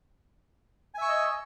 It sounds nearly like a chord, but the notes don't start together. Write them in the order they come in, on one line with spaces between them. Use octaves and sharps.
G#5 E5 C#6 E6 D#5